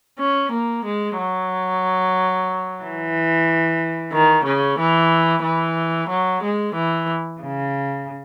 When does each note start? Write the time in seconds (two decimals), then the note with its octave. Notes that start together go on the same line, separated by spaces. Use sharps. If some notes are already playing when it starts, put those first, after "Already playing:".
0.19 C#4
0.51 A#3
0.84 G#3
1.18 F#3
2.81 E3
4.12 D#3
4.45 C#3
4.78 E3
5.44 E3
6.10 F#3
6.42 G#3
6.75 E3
7.41 C#3